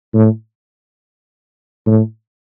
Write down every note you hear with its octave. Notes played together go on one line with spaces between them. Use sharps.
A2
A2